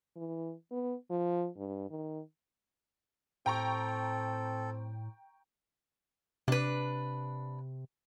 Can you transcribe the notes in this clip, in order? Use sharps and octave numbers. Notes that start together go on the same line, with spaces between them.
E3
B3
F3
G2
D#3
A2 C4 A4 G5 A#5 C#6
C3 D4 B4